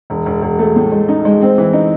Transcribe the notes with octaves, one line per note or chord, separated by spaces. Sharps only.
E1
E1
E1
A3
A2
G#3
D#4
G#3
C4
E3
D#4